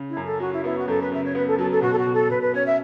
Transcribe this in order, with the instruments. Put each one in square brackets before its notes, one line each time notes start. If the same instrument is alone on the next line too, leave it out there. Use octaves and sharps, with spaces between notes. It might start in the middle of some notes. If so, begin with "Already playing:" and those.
Already playing: [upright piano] C#3
[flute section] E4
[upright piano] F#2
[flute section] A4
[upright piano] F#3 [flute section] F#4
[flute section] E4
[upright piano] B3 [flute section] E4
[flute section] F#4
[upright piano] F#2 [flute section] A4
[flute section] B4
[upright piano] C#3 [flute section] E5
[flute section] C#5
[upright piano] B3 [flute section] B4
[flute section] A4
[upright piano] F#3 [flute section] A4
[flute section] A4
[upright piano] B2 [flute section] F#4
[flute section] A4
F#4
[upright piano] B2
[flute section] A4
[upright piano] B2 [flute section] B4
[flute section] B4
[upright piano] C#4 [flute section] C#5
[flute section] E5